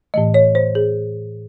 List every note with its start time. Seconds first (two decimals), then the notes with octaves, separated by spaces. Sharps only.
0.14 A2 E3 A3 D#5
0.34 C#5
0.55 C5
0.75 G#4